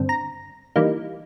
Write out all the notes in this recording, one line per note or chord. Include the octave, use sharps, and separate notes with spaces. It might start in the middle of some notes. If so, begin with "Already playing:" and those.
Already playing: G2 D3 C4
A#5
E3 G3 A#3 D#4